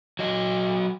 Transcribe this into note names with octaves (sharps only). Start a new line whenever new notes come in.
F#3 D#5